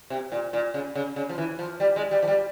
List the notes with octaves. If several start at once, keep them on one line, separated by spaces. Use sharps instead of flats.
C3
A#2
A#2
C#3
C#3
C#3
F3
E3
F3
G3
G#3
G3
F3
G3